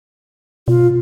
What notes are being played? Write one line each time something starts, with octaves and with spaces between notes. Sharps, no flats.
B2 F4